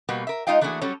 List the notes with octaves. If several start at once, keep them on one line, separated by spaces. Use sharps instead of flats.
B2 G3 A#3 F#4 B4
A#4 E5
G#3 D#4 F4 D#5 F5 G5
E3 A3 A#3 D4 F#4 G#4
F#3 G3 C#4 A4 C#5